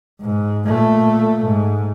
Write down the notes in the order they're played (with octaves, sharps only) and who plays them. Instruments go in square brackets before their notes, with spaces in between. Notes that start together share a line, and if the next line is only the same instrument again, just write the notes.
[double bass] G#2
A#2 A3
G#2